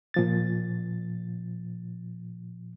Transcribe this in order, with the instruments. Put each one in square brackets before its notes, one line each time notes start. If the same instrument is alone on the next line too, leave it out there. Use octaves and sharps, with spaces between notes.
[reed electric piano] A#2 F3 A6